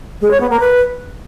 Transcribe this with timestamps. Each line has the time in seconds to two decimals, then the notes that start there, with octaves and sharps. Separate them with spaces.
0.21 G#3
0.31 C#5
0.40 B3
0.50 A#3
0.60 B4